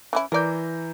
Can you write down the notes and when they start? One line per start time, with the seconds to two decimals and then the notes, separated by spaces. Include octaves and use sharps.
0.13 E3 C#4 E4
0.32 E3 A#4 D5 A#5 G6